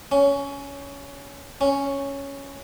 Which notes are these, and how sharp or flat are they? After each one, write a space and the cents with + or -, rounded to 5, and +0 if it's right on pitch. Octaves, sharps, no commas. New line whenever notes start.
C#4 +15
C#4 +0